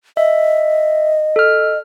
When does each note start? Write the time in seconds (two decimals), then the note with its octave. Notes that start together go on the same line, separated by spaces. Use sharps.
0.17 D#5 E5
1.36 A4 F6